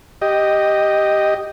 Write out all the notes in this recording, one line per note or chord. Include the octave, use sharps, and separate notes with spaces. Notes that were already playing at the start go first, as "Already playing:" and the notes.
G4 D#5